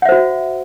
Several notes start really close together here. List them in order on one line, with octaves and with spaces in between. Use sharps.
F#5 E5 C5 F#4